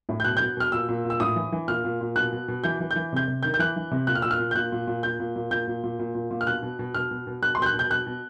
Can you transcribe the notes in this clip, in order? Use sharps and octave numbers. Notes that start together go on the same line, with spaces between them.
A2
G6
B2 F#6
G6
B2
B2 F6
A#2 E6
A#2
A#2
E6
A2 D#6
E3
E3
A#2 F6
A#2
A#2
B2 F#6
B2
B2
E3 G6
E3
G6
E3
C3 G6
C3
D#3 G6
G6
E3 F#6
E3
C3
A#2 F#6
F6
A#2 E6
F6
A#2
G6
A#2 F#6
A#2
A#2
A#2 G6
A#2
A#2
A#2 G6
A#2
A#2
A#2
A#2
A#2
F6
B2 F#6
B2
B2
B2 F6
B2
B2
B2 F#6
C6
B2 G6
F#6
B2 G6
B2 F#6
B2